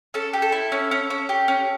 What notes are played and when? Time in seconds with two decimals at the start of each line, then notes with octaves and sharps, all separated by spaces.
0.14 C#4 A4
0.33 G4
0.42 A4
0.52 E4
0.72 C#4
0.91 C#4
1.10 C#4
1.29 G4
1.48 C#4